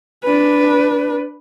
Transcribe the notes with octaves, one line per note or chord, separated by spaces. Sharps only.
D4 B4